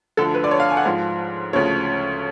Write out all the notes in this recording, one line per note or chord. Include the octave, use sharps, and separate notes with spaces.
D2 D3 F3 A4
B4
D5
C#5
F5
G#5
F#5
G#2 F3 F5
D2 C#3 F3 C#5